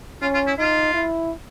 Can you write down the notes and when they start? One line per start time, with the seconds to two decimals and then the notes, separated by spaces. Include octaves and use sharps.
0.22 C#4 F4
0.34 F4
0.47 E4
0.58 D#4 F4
0.94 E4